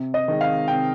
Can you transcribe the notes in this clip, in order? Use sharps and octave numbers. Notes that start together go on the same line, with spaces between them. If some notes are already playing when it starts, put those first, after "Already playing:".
Already playing: C3
D#5
D#3 G#3 C4
F5
C3 G5